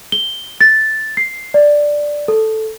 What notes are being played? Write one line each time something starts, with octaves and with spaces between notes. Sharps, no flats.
G7
A6
C7
D5
A4